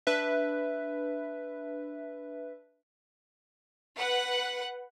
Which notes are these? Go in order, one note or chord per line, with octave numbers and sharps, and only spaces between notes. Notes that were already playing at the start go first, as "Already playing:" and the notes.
D4 B4 E5
B4 F#5 F#6